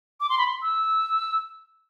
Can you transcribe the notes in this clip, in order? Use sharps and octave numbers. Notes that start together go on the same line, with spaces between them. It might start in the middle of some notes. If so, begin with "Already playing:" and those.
D6
C6
B5
C6
E6